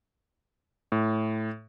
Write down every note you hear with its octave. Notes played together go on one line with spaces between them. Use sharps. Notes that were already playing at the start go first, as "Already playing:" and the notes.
A2